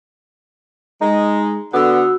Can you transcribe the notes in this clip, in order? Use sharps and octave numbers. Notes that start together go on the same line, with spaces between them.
G#3 D#4
D3 B3 F#4 E6